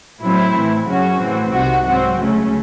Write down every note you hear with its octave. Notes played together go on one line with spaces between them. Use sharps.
A2 F#3 A3 C4 E4
A2 E3 A3
F#2 C#3 F#3 C#4 F#4
A2 E3 C4
C2 C3 D#3 F#4
G#2 F#3 C4 F#4
C#2 C#3 F#3 A3 C#4